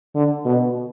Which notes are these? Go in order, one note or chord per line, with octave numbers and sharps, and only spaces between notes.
D3
B2